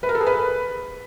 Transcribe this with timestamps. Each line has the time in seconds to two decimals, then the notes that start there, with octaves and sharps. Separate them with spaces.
0.03 B4
0.09 A#4
0.15 A4
0.21 G#4
0.27 B4